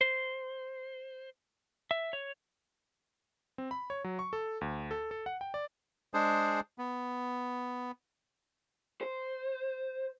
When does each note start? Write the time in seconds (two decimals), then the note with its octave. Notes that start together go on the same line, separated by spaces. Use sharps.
0.01 C5
1.91 E5
2.13 C#5
3.58 C4
3.71 B5
3.90 C#5
4.04 F#3
4.19 C#6
4.33 A4
4.61 D2
4.91 A4
5.11 A4
5.26 F#5
5.41 G5
5.54 D5
6.14 G#3 D4 G#4 C5
6.78 B3
9.01 C5